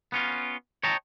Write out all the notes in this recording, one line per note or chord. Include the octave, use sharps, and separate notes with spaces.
B3 C#4 F4
C#5 D#5 G5 A5 A#5